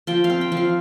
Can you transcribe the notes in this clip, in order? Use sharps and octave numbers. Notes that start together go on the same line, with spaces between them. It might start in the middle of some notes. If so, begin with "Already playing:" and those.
F3 G5
F5
C4
G5
F3 F5